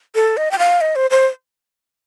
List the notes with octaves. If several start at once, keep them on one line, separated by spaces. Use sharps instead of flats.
A4
D#5
G5
F5
D#5
C5
C5